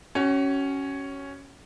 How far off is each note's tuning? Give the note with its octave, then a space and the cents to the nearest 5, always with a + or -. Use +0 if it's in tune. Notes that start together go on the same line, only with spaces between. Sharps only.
C#4 +0 F#4 +40